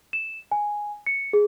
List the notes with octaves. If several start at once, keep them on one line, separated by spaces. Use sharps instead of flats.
E7
G#5
C#7
G#4